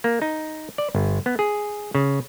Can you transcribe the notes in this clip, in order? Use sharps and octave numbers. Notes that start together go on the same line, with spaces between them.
A#3
D#4
D5
G1
B3
G#4
C#3